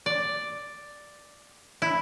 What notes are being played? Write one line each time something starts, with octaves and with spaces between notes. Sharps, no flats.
D5
E4